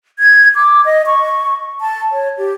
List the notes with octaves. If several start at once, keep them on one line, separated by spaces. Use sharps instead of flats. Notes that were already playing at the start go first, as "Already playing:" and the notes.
G#6
D6
D#5
C#6
A5
C#5
G4